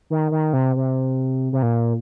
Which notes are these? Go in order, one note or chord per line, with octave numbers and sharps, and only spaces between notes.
D#3
D#3
C3
C3
C3
A#2